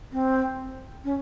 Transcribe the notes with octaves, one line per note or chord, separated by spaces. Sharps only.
C4
C#4